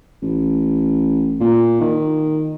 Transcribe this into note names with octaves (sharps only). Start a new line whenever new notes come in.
A1
A#2
D#3